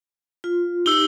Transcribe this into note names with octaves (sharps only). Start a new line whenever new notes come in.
F4
D#4 G4 E6 G7